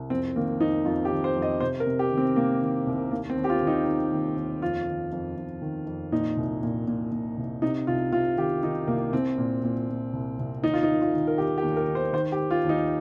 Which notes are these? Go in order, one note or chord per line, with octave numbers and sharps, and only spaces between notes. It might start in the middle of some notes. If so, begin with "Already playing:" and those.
Already playing: C2
F2 C4
D#3 A#3
F2 D#4
F2 F4
G4
D#3
C5
F2
D#5
C3 C5
A#4
C3
G4
D#3
C4
C3 A#3
D#3
C2
D#2 A#3
C4
D#2
G4
F4
D#3
D#4
D#3
D#2
D#2
F2 F4
D#3
F2
F2
D#3
F2
A#2 D#4
C2
A#2
A#2
A#2
C2
C3 D#4
C2 F4
C3 F4
D#3 G4
D#3 D#4
C2 A#3
C2 C4
A#2
A#2
A#2
C2
C2
D#2 D#4
F4
D#4
D#3
F4
D#3
A#4
D#3 G4
G4
D#2
A#4
D#3
C5
D#3 C5
G4
D#3
F4
D#2
D#4